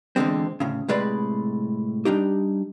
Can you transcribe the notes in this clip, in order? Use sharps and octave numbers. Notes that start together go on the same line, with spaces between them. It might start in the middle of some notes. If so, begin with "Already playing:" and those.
E2 A#2 D3 G#3 C4
D2 A2 C#3
A2 C3 G#3 B4 D5 B5
G3 D4 D#4 G4